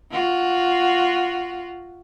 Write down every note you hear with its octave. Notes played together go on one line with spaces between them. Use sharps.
F4 F#4